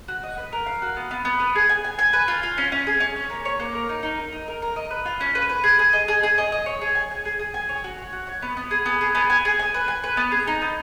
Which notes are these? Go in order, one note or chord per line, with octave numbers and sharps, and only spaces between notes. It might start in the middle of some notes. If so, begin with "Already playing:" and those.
F#4
D#5
B4
A#4
F5
F#4
B3
B3
B3
B4
G#4
G#5
G#5
G#5
B4
F4
F4
C#4
C#4
G#4
C#4
C#5
A#3
C#5
A#3
A#4
D#4
D#4
A#4
D#4
A#4
A#4
D#5
B4
F4
C#4
B4
B4
G#4
G#4
D#5
G#4
G#4
D#5
D#5
C#5
G#4
G#5
G#5
G#4
G#4
G#5
C#5
F#4
C#5
F#4
C#5
B3
B3
G#4
B3
G#4
B3
G#5
G#4
G#5
B4
G#5
B4
B3
G#4
D#4
B3